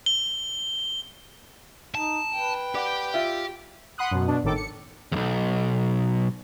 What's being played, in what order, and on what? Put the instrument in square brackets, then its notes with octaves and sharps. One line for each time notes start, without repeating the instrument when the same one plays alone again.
[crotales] G7
[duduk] D#4 [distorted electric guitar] A5
[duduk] B4 [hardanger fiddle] G5
[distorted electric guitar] G4 [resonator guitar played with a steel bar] D5 F#5
[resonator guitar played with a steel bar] F4 E5
[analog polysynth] F#5 B5 C6 D#6 F#6
F#2 B2
B2 D4
G#1 A2 D#3 A4 D6
C#7
[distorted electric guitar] B1 E2